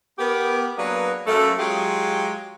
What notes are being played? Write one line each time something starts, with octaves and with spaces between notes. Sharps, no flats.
B3 G4 A#4
F#3 A#3 B3 D4 G#4 B4
F#2 A3 A#3
F#3 G#3 F4 G4 G#4